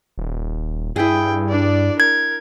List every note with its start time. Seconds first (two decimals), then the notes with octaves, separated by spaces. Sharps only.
0.18 D#1
0.96 G2 E4 G#4 G5
1.49 D4 D5
2.00 A#4 G#6